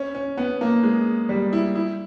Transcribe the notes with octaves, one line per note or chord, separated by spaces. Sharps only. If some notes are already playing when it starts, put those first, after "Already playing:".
Already playing: C#4
C#4
B3
A#3
G#3
G3
E4
E4